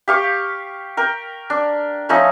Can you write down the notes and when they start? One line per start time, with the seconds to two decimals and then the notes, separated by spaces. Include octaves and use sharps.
0.08 G4 F5 C#6
0.97 A#4 G5
1.50 D4
2.09 F3 A3 C#4 D#4